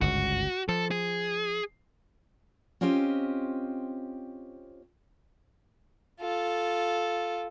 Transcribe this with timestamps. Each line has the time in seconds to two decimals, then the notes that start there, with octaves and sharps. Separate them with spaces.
0.01 G1 C#2 G#2 F#4
0.69 F3 A4
0.91 G#4
2.81 C4 C#4 F4 G4 C5 D#5
6.21 F4 A4